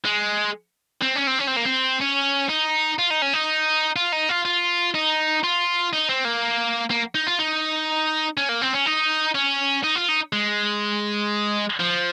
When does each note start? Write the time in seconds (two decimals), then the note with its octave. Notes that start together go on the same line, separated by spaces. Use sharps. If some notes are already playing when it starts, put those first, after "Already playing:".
0.05 G#3
1.02 C4
1.16 C#4
1.27 C4
1.39 C#4
1.48 C4
1.57 A#3
1.65 C4
2.01 C#4
2.49 D#4
2.99 F4
3.10 D#4
3.22 C#4
3.34 D#4
3.96 F4
4.12 D#4
4.29 F4
4.45 F4
4.95 D#4
5.44 F4
5.93 D#4
6.09 C4
6.25 A#3
6.90 A#3
7.15 D#4
7.27 F4
7.39 D#4
8.37 C#4
8.49 A#3
8.61 C4
8.73 C#4
8.86 D#4
9.35 C#4
9.84 D#4
9.95 F4
10.08 D#4
10.33 G#3
11.80 F3